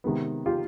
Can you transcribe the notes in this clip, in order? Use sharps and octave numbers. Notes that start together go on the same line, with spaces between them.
C3 D#3 G#3 B3
F4 G4